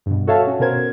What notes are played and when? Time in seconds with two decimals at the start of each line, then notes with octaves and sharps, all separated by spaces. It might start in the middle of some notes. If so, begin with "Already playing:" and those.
0.06 G2 B2
0.27 F#4 A4 C#5 E5 F5 A5
0.47 C#4 F#4
0.59 B2 C#4 F#4 A#4 C5 G#6